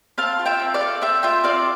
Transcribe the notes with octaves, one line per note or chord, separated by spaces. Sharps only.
C4 F5 A5
F4
E5 G5
C4
D5 F5
A4
C4 E5 G5
F4 E5 G5
C4 D5 F5